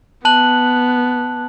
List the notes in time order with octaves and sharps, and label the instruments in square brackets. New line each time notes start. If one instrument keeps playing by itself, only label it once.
[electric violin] B3 [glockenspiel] A5 F#6 F#7